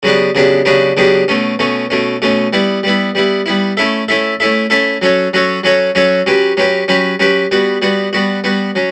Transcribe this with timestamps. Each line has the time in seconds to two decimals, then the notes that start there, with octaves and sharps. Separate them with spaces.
0.03 C#3 F#3 B3 D4 G4
0.35 C#3 F#3 B3 D4 G4
0.65 C#3 F#3 B3 D4 G4
0.97 C#3 F#3 B3 D4 G4
1.28 B2 A3 C#4
1.59 B2 A3 C#4
1.90 B2 A3 C#4
2.22 B2 A3 C#4
2.53 G3 B3 E4
2.83 G3 B3 E4
3.15 G3 B3 E4
3.46 G3 B3 E4
3.77 A3 C#4 E4 A4 E5
4.08 A3 C#4 E4 A4 E5
4.40 A3 C#4 E4 A4 E5
4.70 A3 C#4 E4 A4 E5
5.02 F#3 C#4 F#4 A4 C#5
5.33 F#3 C#4 F#4 A4 C#5
5.64 F#3 C#4 F#4 A4 C#5
5.95 F#3 C#4 F#4 A4 C#5
6.26 F#3 C#4 G4 B4
6.57 F#3 C#4 G4 B4
6.88 F#3 C#4 G4 B4
7.19 F#3 C#4 G4 B4
7.51 G3 B3 F#4
7.82 G3 B3 F#4
8.13 G3 B3 F#4
8.44 G3 B3 F#4
8.75 F#3 C#4